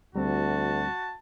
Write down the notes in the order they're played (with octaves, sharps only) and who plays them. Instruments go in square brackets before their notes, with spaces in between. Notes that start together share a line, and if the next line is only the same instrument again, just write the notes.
[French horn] D2 [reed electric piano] G3 C4 [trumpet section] F#4 A5